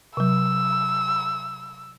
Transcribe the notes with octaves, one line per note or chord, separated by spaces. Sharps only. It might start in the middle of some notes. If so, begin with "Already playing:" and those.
C3 F#3 E6